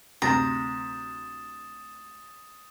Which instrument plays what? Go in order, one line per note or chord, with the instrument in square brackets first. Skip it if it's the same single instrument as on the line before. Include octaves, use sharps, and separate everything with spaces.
[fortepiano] D2 C3 C4 [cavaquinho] A#5 [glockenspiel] D#6 A6 E7